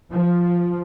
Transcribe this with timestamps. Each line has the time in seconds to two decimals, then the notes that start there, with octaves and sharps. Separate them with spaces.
0.12 F3